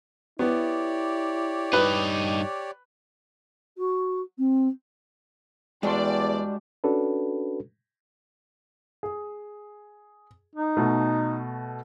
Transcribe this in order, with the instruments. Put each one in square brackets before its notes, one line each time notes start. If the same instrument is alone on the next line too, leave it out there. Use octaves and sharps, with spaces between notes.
[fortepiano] B3 [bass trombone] E4 [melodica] G4 C#5 D5
[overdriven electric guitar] G2 D#4 [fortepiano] B4
[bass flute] F#4
C4
[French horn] E2 [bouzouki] G3 D4 [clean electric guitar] G#3 F#4 C6 [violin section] D5
[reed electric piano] C#4 D4 F#4 A4 B4
[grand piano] G#4
[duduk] D#4
[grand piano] B2 A3